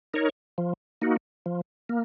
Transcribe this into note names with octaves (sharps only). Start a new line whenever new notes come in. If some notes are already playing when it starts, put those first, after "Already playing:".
D#4 A#4 C#5
F3
A#3 D#4 F#4
F3
A#3